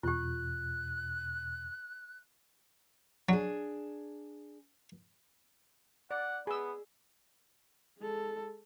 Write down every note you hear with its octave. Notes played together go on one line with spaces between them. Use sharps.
E2 B2 F4 G4 F#6
F#3 D4 G#4
D5 F#5
B3 G#4 E6
G#3 A4